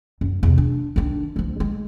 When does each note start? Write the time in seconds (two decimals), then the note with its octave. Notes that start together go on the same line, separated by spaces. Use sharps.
0.21 F#2
0.43 E2 C3
0.58 D4
0.96 D#3 D4
1.36 D2 F3
1.60 G#3